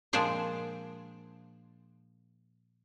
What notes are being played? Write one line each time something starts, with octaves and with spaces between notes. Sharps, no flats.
A#2 F3 G#3 D4 G#4 C5